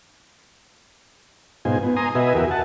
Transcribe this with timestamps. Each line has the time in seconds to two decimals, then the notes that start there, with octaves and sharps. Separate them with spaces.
1.65 G#2 B2 D#4 F4 C5 G#5
1.83 B3
1.96 G#5 A#5 C6 D#6
2.15 B2 F#4 B4 D#5 E5 G#5
2.35 E2 F#4 G4 A#4 E5
2.51 F#5 A5